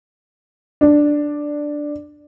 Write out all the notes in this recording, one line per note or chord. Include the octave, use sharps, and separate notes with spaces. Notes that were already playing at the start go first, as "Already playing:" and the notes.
D4